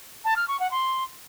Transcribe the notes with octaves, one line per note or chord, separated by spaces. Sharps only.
A5
F6
C#6
F#5
C6